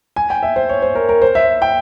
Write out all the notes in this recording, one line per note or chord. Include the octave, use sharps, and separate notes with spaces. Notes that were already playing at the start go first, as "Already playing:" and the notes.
G#5
G5
E5
C5
C#5
C5
A#4
A#4
C5
E5
G5